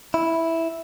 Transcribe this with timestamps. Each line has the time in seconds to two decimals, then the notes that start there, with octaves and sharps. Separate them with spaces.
0.14 E4